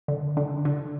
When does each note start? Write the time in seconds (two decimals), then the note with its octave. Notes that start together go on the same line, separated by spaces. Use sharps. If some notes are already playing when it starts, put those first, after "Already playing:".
0.08 D3
0.37 D3
0.65 D3